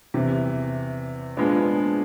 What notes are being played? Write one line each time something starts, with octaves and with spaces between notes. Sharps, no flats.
E2 C3 E3
A#2 F3 G#3 B3 D4